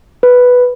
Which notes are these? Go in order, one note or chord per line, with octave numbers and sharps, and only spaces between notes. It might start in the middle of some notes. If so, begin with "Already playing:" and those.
B4